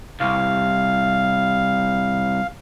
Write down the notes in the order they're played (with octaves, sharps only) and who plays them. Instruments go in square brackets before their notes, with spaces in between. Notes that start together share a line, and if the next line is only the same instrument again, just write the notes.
[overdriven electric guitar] C2 [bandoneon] F5